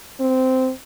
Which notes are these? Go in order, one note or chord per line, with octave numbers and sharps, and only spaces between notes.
C4